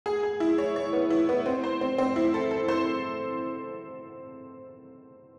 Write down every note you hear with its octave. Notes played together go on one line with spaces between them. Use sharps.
G#4
G#4
E4
C#5
C#5
B3
E4
B3
C4
C5
C4
C4
E4
A4
A4
C5